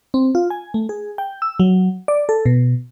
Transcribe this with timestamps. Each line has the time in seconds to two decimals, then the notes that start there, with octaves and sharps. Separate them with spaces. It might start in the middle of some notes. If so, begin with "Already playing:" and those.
0.14 C4
0.35 F4
0.50 G#5
0.74 A3
0.89 G#4
1.18 G5
1.42 E6
1.60 F#3
2.08 D5
2.29 A4
2.46 B2